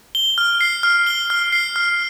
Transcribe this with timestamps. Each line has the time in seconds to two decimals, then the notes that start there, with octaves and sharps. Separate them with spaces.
0.15 G7
0.38 F6
0.61 C7
0.83 F6
1.07 G7
1.30 F6
1.52 C7
1.76 F6